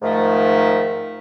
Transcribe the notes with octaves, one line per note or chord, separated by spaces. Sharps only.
G#2 D#3 F3 A3